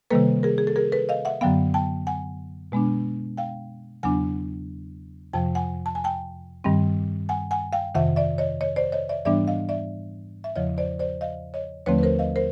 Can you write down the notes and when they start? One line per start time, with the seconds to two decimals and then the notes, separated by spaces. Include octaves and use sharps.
0.11 C3 D#3 G3 A#3 A4 B4
0.43 G#4 A#4
0.58 G#4
0.67 A4
0.76 G#4 A#4
0.92 A4 B4
1.09 D#5 F5
1.25 E5 F#5
1.41 F#2 D3 F#3 B3 F5 G5
1.74 G5 A5
2.07 F#5 G#5
2.72 B2 G#3 B3 D4
3.37 F5 G5
4.03 E2 C#3 F#3 B3 D4 F#5 G#5
5.33 F2 C3 F3 G5 A5
5.55 F#5 G#5
5.86 A5
5.95 G#5
6.04 G5 A5
6.64 G2 D#3 G3 C4
7.29 F#5 G#5
7.51 F#5 G#5
7.73 F5 G5
7.95 F2 C3 D#3 E5 F#5
8.16 D5 E5
8.38 C#5 D#5
8.61 C#5 D#5
8.76 C5 D5
8.92 C#5 D#5
9.09 D5 E5
9.25 G#2 E3 G3 B3 D4 D5 E5
9.48 D#5 F5
9.69 D5 E5
10.44 E5
10.56 E2 C#3 F3 C#5 D#5
10.78 C5 D5
10.99 C5 D5
11.21 D#5 F5
11.54 C#5 D#5
11.86 D#2 D3 F3 A3 C4 B4 C#5
11.99 B4
12.03 A#4 C5
12.19 D#5 F5
12.36 A#4 C5